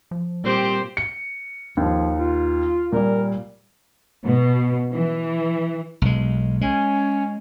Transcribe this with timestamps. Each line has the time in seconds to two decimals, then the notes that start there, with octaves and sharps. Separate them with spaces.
0.11 F3
0.44 A#2 G3 C4 G4 C5
0.97 C#7
1.77 D#2 F3
2.18 F4
2.92 A#2 G3 A#4
4.24 B2
4.93 E3
6.02 B1 G#3
6.61 G#3 C#4